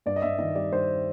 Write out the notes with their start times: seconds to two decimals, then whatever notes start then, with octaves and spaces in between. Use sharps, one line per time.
0.06 G2 D5
0.16 D#5
0.22 G2 E5
0.39 D#3 D#5
0.55 G3 D5
0.72 G2 C5